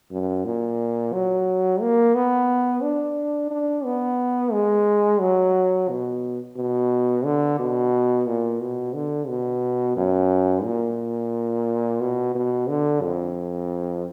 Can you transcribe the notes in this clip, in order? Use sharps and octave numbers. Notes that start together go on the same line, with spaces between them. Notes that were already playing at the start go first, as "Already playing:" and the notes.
F#2
A#2
F#3
A#3
B3
D4
D4
B3
G#3
F#3
B2
B2
D3
B2
A#2
B2
D3
B2
F#2
A#2
B2
B2
D3
F2